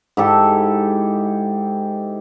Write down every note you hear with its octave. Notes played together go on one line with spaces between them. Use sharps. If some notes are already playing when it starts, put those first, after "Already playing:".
G#2 E4 G4 A4